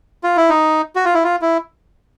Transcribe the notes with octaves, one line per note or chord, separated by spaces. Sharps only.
F4
E4
D#4
F#4
F4
E4
F4
E4